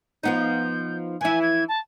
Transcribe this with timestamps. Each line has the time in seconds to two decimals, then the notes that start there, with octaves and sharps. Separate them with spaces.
0.23 F3 B3 D#4 G6
1.21 E3 E4 G#5
1.42 G#6
1.68 A5